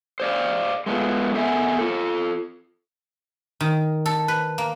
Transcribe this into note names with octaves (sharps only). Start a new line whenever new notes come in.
C5 D5 F5
G#3 A3 B3 F4
B3 A4 E5 F#5 G#5
F4 A4
D#3
A4
B4
A#3